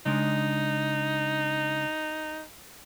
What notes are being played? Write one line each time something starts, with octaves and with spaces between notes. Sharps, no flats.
C#3 G#3 D4 D#4